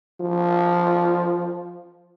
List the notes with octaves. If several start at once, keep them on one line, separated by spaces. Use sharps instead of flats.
F3